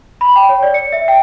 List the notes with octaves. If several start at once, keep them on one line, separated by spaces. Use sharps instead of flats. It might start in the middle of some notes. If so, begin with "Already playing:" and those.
B5
G5
C#5
D5
C#7
E5
G5